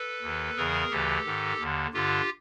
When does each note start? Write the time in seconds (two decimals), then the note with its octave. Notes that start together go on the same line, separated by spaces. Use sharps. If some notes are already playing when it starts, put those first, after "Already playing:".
Already playing: A4 B4
0.22 D#2 D#3
0.57 E2 C#3 E3 G#4 A#4
0.91 D2 C#3 E3 G4 A4
1.26 G#2 D#3
1.59 D#2 D3
1.94 G2 D3 F4 G4